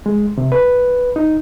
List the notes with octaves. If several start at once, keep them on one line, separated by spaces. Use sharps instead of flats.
G#3
C3
B4
D#4